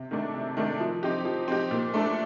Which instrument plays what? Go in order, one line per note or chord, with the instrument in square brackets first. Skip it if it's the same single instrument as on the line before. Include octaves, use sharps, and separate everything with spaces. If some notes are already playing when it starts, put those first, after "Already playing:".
Already playing: [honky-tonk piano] C3
D#3 A3 D4
C3
D#3 A3 D4
F3
C4 D#4 G4
F3
C4 D#4 G4
A#2
A3 D4 A4